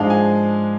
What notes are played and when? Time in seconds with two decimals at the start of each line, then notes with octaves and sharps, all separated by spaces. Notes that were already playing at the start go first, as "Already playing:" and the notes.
Already playing: G#2 F3 G#3 D4 F5 G#5
0.10 G#5